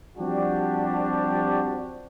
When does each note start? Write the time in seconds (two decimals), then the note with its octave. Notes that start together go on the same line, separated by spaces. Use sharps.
0.18 F3 G3 C4 D4 F#4 G4